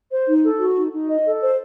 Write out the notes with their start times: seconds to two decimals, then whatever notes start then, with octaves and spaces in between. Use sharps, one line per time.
0.11 C5
0.27 D#4
0.43 A4
0.60 F#4
0.76 D#4
0.92 D#4
1.08 D#5
1.25 A4
1.41 C5